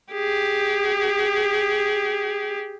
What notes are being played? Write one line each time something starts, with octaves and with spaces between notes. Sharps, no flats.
G4 G#4